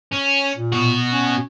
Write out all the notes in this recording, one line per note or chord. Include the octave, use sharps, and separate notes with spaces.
C#4
A#2
B2 F#4
C#4